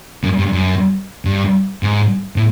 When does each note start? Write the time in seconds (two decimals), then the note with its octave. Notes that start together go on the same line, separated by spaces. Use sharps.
0.23 F#2
0.38 G2
0.53 F#2
1.25 G2
1.83 G#2
2.36 A2